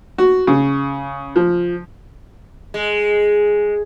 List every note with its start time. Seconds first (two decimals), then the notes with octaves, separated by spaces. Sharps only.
0.18 F#4
0.47 C#3
1.36 F3
2.74 G#3